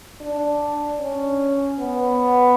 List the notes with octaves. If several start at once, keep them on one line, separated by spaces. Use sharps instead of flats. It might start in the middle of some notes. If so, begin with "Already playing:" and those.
D4
C#4
B3